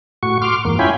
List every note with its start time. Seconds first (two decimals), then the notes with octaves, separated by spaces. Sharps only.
0.23 A2 F#4 C#6
0.42 C6 D6 F6
0.65 E2 G#2 A#3
0.79 C#4 E4 F4 G5 G#5 B5